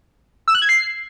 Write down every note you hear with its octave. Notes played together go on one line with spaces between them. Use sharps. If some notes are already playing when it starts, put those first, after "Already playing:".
E6
F#6
G#6
C7